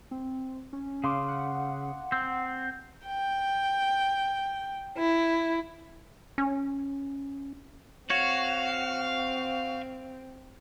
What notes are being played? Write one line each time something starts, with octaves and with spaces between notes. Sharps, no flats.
C4
C#4
C#3 F5 C6 D6
F#5
C4
G5
E4
C#4
C4 F#4 C#5 F5